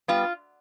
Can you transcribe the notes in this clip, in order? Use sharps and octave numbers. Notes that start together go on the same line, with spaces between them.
G3 B3 F4